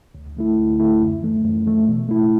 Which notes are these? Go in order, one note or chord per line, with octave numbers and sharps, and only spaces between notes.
D2
D3 A3 E4
D2
D3 A3 E4
F#2
E3 A3
F#2
E3 A3
B2
A3 E4